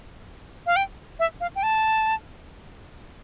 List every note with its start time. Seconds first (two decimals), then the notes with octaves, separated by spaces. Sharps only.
0.66 F5
0.76 G5
1.19 E5
1.41 F5
1.56 G5
1.63 A5